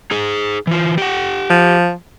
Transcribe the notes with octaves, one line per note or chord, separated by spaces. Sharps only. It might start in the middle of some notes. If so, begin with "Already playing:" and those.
D#4 G#4
E3 F4
G4 F#5
F3